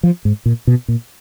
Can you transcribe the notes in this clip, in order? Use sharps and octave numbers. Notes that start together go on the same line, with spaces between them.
F3
G#2
A#2
B2
A#2